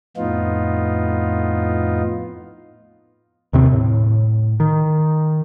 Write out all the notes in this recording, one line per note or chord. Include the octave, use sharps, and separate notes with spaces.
F2 A2 B3 D#4 F4
D#2 C3 D#3 C4
A2
D#3